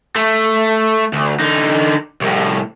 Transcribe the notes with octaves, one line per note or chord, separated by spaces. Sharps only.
A3
D2
D3 D#4
C2 A2